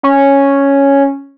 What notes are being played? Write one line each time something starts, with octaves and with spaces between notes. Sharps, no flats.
C#4